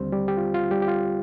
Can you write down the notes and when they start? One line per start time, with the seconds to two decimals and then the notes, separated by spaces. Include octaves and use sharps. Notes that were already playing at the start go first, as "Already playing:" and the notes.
Already playing: D#2 D3 G3 C4 C5
0.12 G3 G4
0.28 G4
0.37 F4
0.54 F4
0.71 G3 G4
0.82 G4
0.88 F4